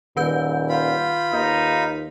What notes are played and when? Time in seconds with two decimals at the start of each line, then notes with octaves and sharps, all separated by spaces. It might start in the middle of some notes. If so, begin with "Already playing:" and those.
0.17 D#1 D#3 B4 G6
0.69 F4 B5
1.33 D#2 D#4